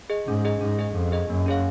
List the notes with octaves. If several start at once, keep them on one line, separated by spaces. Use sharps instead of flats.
G#4 D#5
G#2 C#4
G#4 D#5
G#2 C#4
G#4 D#5
F2 C#4
G#4 D#5
F#2 A#3
C#4 G#4 C#5 F5